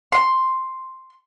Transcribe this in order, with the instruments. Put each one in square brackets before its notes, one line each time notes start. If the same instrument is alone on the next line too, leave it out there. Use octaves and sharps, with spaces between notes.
[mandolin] C6